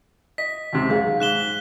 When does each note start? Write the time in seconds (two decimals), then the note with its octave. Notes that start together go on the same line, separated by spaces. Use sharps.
0.38 D#5 B6
0.73 D#2 G#2 C3
0.90 B1 G#4 F5
1.20 G#2 F#6 E7 G7